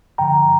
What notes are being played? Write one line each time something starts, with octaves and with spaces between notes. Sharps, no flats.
G2 D3 F3 G5 A#5